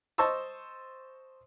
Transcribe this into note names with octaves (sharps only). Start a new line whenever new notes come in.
C5 D#5 A5 C#6 E6